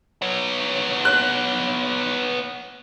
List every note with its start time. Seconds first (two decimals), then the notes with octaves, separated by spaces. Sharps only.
0.22 B3 C#5
1.05 F#6